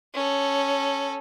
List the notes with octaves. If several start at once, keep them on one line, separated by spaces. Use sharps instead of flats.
C#4 A4